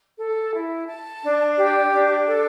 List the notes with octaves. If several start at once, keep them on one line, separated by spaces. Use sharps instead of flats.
A4
E4
A5
D4
G4
D4
A4